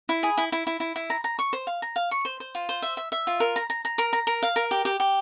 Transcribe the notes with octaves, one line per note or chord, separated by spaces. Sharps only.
E4
G#4
E4
E4
E4
E4
E4
A#5
A#5
C#6
C5
F5
A#5
F5
C#6
C5
C5
F4
C5
E5
E5
E5
F4
A#4
A#5
A#5
A#5
A#4
A#5
A#4
F5
A#4
G4
G4
G4